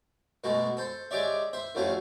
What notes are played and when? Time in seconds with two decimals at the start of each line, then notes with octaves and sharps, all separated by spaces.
0.44 B2 G#3 A3 F#4
0.77 A4 C5
1.11 G#3 G4 C#5 D5 E5
1.53 C5 E5
1.75 A1 F2 F#3 A3 C#4 F5